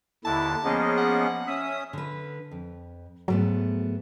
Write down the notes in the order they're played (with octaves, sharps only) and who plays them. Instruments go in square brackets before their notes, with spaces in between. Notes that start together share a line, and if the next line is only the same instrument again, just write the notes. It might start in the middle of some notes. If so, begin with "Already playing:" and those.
[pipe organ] D#2 D3 A6 [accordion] E4 [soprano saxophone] A5
[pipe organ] F3 A#3 B3 [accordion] C#4 G#4 D#5
[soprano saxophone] F#5
[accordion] C#4 D#6 [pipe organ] E5
[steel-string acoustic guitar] D3 B4
F2
[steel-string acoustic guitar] G#2 A3 B3 [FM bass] F#3